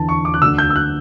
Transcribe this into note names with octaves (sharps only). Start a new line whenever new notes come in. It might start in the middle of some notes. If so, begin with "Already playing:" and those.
Already playing: E2 D3 A5
C#6
D6
F#6
D2 D3 E6
G6
E6
F#6